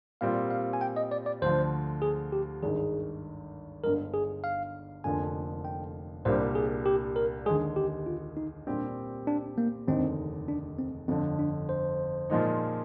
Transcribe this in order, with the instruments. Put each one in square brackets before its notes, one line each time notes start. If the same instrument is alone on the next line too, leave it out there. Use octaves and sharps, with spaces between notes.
[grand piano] A#2 G3 C4 F4 [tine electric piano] F5
[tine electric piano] F5
G#5
G5
D#5
D5
D5
[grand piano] D2 D3 F3 [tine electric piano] C5
[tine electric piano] G#4
G4
[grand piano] G#1 G2 D#3 [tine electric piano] G#4
[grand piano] G1 G2 D3 G#3 [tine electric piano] A#4
[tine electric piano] G#4
F5
[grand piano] F1 F2 D3 F3 A#3 [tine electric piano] G#5
[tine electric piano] G5
[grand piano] C2 A#2 G3 A#3 D4 [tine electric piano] C5
[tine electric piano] G#4
G4
A#4
[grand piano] D#2 D3 G#3 [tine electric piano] G#4
[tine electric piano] G4
F4
D#4
[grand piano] A#2 G3 C4 G4 [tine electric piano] D4
[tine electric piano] D4
A#3
[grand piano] F1 D#2 D3 G#3 D#4 [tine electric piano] C4
[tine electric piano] D4
C4
[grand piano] G1 F2 D3 [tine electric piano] C4
[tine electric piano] D4
C5
[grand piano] A#2 F3 G#3 D#4